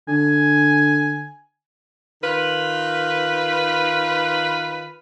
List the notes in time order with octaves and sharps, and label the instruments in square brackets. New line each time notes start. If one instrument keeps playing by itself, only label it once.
[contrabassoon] D3 [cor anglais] G#5
[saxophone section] D#3 F4 B4